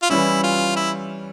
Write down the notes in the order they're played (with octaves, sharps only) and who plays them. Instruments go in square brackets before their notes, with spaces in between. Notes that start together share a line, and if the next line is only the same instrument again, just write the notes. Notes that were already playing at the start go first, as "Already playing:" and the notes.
[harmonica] F4
[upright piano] E3 G3 C#4 [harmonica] E4
[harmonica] F4
E4